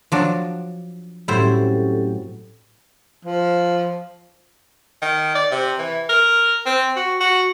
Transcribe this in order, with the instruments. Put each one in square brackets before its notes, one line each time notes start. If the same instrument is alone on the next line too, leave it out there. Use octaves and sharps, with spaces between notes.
[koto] F3 F#3 D4
[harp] A2 F#3 C4 [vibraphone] C#4 G4 A4 [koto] E4 C5
[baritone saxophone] F3
[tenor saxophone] D#3
D5
C3
E3
A#4
C4
F#4
F#4